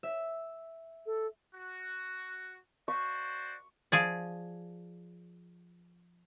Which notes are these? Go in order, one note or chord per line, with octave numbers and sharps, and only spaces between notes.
E5
A4
F#4
F#4 C5 D5 C#6
F3 G#4 D5